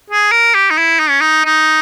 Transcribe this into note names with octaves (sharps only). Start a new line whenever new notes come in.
G#4
A#4
G4
D#4
E4
D#4
C#4
D#4
D#4